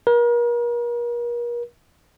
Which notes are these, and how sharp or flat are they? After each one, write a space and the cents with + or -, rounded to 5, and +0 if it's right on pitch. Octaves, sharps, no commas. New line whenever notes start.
A#4 +40